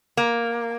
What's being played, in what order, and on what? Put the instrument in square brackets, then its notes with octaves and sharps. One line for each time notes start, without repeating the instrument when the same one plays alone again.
[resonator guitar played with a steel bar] A#3